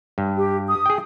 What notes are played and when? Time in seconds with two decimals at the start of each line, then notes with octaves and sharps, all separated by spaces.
0.18 G2
0.37 G4
0.68 D#6
0.86 G#4 G5